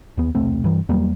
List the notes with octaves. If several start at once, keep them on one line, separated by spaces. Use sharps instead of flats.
D#2 B3
E1 C2 A3 C4
G2 E3
E2 F#3 G3 A#3